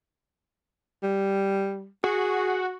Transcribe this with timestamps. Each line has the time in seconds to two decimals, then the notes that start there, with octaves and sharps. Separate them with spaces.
1.03 G3
2.04 F#4 G#4